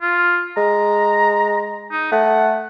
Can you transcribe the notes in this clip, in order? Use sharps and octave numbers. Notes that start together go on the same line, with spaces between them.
F4
G#3 A#5
D#4
A3 F#5